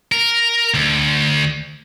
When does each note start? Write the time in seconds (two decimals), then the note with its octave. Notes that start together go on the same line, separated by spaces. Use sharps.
0.12 A#4
0.74 D2